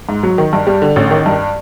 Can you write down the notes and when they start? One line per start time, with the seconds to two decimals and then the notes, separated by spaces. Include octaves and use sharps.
0.09 G#2
0.23 F#3
0.38 D#3
0.53 G2
0.67 G3
0.82 D3
0.96 A1
1.11 D#3
1.26 G2